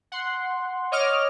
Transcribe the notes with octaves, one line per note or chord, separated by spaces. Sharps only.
F#5 C6
C#5 D#5 D6 F6